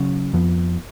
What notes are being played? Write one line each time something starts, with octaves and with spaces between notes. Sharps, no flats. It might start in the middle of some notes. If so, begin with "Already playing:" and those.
Already playing: C#3 F#3 C#4
F2 F3 B3